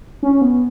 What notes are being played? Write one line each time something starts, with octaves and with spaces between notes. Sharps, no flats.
C#4
B3